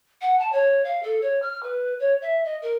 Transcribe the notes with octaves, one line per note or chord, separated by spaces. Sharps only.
F#5
A5
C#5
F5
A4
C#5
F6
B4
C#5
E5
D#5
A#4